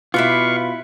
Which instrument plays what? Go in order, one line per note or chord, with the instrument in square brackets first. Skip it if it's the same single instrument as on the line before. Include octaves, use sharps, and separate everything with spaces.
[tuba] B2 [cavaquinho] E4 B4 D6 [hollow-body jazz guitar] F4 [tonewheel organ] F5 C#6